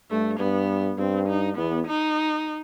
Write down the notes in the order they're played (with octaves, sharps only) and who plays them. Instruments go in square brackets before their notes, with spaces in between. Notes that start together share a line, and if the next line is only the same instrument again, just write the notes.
[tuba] G2 [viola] A3
[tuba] G2 [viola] B3
[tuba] G2 [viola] C4
[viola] D#4
[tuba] E2 [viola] B3
[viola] D#4